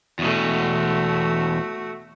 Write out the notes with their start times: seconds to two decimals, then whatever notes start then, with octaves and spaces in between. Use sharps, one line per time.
0.19 E2 B2 A3 F#4